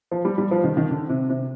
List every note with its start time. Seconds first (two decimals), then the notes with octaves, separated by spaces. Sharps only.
0.11 F3
0.25 G3
0.38 G3
0.51 F3
0.64 D#3
0.77 D#3
0.91 D3
1.09 C3
1.29 C3